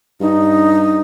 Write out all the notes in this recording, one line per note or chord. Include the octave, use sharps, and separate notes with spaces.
G2 D#4